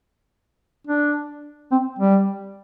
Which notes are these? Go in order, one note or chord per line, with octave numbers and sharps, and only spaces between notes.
D4
C4
G3